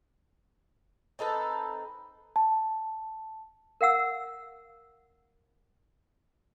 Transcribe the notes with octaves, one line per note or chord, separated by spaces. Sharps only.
C4 D#4 A4 B4
A5
A#4 F5 F#5 E6